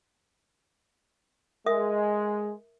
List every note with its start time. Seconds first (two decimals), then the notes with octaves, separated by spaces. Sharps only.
1.66 G#3 A#4 E5 D#6